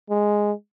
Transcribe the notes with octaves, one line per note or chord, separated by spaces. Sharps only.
G#3